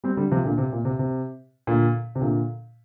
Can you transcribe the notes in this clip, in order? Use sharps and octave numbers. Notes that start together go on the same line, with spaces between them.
G3 C4
D3 G3
C3 F3
A#2 D3
C3
A#2
C3
C3
A#2 D3
C3
A#2 D3